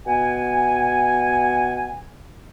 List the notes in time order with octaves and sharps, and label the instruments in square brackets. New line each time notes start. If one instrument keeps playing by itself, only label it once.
[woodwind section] B2 F#5 G#5